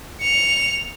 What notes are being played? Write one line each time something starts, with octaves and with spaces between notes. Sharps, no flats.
C#7 F7